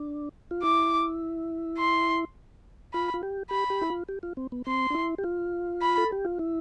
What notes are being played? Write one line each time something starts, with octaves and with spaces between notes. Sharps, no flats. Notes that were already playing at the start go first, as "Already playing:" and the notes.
Already playing: D4
F4
E4 D6
C6
F4 B5
F4
G4
G4 B5
G4
E4
F4
G4
F4
C4
B3
C4 C6
D4
E4
G4
F4
B5
A4
G4
F4
E4